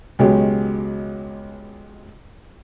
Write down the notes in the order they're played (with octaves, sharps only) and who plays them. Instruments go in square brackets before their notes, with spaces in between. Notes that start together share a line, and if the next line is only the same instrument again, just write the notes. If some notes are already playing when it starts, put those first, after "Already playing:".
[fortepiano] C#2 B2 F#3 G#3 G4